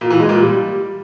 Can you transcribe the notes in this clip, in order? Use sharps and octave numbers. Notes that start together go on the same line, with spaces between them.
A#2
E3
G#3
A#2
G3